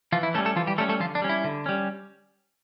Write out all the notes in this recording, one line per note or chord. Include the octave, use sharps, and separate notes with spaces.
E3 F3 F4
E4
G3 A3 C#4 A4
A3 A4
E3 F3 F4
G3 G4
G3 A3 C#4 A4
A3 A4
D3 F3 F4
D4
G3 C#4
E4
D3
G3 C#4